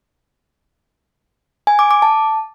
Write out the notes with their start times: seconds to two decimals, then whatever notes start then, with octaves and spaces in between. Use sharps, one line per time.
1.67 G#5
1.79 D6
1.91 D6
2.02 A5